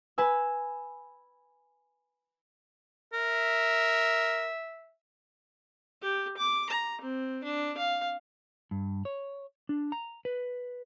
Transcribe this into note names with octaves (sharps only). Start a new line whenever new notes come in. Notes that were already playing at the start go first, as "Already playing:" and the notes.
B4 G#5 E6
A#4 E5
G4
D6
A#5
C4
D4
F5
G2
C#5
D4
A#5
B4